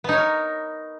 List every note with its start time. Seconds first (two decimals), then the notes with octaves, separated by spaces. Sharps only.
0.04 B3
0.09 D#4
0.13 C#5
0.18 A#4